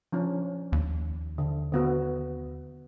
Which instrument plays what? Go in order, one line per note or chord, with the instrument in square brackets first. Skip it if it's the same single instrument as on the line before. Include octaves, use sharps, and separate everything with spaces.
[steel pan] F3 C#4 D4
[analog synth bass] D#2
[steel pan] D3
D3 B3 F#4